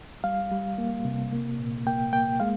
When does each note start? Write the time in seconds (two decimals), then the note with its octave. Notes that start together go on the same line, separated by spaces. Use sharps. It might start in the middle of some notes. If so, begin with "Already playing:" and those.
0.24 G3 F5
0.51 G3
0.78 A#3
1.05 C3
1.32 A#3
1.59 A#2
1.87 A#3 G5
2.13 A#3 G5
2.40 G#3 F5